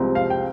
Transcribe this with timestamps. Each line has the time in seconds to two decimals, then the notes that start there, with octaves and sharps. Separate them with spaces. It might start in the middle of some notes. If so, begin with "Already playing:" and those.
Already playing: C2 C3 F3 G#3 C4
0.15 F5
0.30 G5